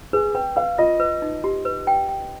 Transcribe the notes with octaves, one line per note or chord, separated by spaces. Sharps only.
G#4 B4
B4 G5
B4 F5
F4 D#5
B4
D#4
G4
B4
G5
G5